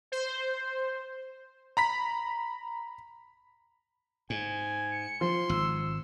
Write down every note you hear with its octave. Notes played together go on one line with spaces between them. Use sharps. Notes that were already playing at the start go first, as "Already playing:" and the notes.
C5
A#5 B5 B6
G#2 G#5
C#7
F3 C6
G#1 E6